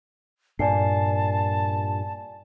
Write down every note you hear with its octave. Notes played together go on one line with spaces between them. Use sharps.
G2 A#2 D5 G#5 A5 C7